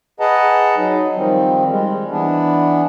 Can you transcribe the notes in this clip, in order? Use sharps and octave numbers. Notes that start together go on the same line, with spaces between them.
G#4 B4 D#5 F#5 A5 A#5
F#3 D#4
D#3 F3 G3 C4
G3 G#3
E3 B3 D4